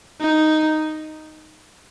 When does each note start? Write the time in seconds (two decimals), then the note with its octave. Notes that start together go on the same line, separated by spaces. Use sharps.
0.21 D#4